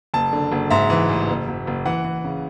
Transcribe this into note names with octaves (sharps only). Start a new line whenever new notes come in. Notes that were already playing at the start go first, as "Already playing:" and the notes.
F#1 A5
D3
F#1
G#2 E5
E3
A1
F#1
F#1
F#1
E3 F#5
E3
C#3